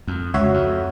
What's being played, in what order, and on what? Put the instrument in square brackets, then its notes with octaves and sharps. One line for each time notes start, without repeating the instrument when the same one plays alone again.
[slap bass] F2
[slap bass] C#2 [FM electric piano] F#4 C#5 E5
[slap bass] F2